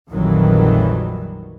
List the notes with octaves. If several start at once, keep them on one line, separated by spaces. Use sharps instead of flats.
A#1 F2 D#3 E3 F#3 G3